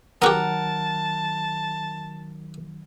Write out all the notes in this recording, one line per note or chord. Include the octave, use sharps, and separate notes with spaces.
D#3 F#3 B3 F#4 G4 A#4 F#5 A5